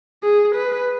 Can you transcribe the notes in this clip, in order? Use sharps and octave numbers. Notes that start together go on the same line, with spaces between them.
G#4
B4